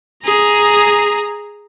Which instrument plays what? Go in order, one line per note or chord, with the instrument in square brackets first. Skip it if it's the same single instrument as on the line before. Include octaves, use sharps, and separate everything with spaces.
[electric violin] G#4 A#5